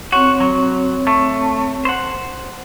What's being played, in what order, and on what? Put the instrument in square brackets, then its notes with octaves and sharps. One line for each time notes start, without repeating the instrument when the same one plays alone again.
[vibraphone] C4 C#5 [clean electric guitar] F#4
[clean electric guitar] F#3
A3
C5 F#5